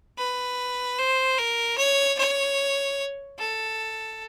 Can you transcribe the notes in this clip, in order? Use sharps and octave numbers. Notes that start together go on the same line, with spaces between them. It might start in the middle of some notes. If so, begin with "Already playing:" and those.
B4
C5
A#4
C#5
C#5
A4